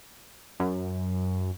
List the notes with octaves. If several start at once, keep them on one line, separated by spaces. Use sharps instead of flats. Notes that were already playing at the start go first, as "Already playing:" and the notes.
F#2